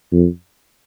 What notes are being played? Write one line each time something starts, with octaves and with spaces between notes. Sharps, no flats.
F2